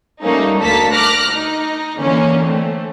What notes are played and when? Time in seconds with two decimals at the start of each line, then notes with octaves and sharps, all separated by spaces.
0.23 G3 A3 A#3 C#4 D#4
0.60 D2 A#3 A4 A5 B6
0.93 D6 F6 F#6 A#6
1.31 D#4
1.97 D3 E3 A#3 C#4
2.46 A3 C4